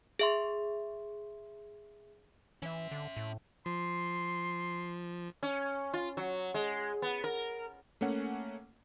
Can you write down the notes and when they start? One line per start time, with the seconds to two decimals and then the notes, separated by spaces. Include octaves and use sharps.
0.19 G#4 E5 C6
2.62 E3 C#4 E5
2.91 D3
3.17 A2
3.66 F3 C6
5.43 C#4
5.94 F4
6.17 F#3
6.54 G#3
7.02 B3
7.24 A#4
8.01 A3 A#3 C#4 F#5